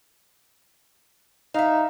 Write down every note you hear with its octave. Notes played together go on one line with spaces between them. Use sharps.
D#4 E5 F5